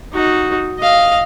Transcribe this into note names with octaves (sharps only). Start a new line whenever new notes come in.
D#4 F#4
D#5 F5